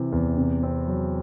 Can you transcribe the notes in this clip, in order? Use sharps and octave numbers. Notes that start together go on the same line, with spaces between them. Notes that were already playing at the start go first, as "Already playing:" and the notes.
Already playing: C3 E3 C4
E2
C3
C4
F#3